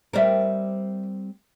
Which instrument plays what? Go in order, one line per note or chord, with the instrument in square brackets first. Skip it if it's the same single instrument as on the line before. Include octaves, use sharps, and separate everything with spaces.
[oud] G3 C4 A#4 [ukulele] B4 D5 E5